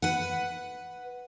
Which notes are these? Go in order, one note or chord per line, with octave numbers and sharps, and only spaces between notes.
B4 F#5